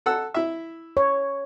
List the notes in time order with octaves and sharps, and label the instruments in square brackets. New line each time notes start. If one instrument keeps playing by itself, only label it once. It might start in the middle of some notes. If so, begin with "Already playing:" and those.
[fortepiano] A4 F#5 E6
E4 E5
[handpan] C#5